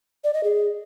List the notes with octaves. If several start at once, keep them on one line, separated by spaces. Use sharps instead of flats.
D5
D#5
G#4